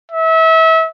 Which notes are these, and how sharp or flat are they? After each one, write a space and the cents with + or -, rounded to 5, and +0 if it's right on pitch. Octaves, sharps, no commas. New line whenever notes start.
E5 -30